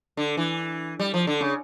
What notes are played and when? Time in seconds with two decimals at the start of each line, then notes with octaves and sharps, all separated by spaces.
0.17 D3
0.37 E3
0.99 G3
1.14 F3
1.27 D3
1.41 C#3